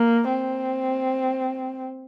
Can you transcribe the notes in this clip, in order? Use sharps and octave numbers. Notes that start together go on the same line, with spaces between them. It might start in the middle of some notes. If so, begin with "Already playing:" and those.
Already playing: A#3
C4